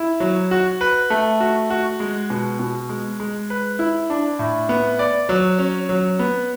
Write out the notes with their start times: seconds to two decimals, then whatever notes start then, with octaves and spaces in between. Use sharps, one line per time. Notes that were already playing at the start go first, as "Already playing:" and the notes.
Already playing: E4
0.20 F#3
0.51 F#4
0.81 B4
1.10 A3
1.40 F#4
1.70 F#4
2.00 G#3
2.30 B2
2.59 B2
2.89 G#3
3.20 G#3
3.50 B4
3.79 E4
4.10 D4
4.39 A2
4.69 B3
4.99 D5
5.29 F#3
5.59 C#4
5.89 F#3
6.19 B3